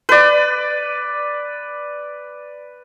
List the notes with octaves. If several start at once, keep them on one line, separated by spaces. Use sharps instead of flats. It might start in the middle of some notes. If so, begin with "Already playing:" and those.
B4 D5